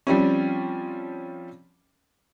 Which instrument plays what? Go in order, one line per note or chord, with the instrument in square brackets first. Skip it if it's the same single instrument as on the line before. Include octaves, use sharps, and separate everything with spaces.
[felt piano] F3 G3 C4 C#4